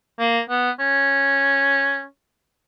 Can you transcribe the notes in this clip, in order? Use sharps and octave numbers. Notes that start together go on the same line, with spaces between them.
A#3
B3
C#4